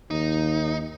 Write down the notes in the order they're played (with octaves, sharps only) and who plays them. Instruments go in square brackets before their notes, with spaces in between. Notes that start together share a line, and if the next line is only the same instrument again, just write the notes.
[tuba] D#2 [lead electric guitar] D#4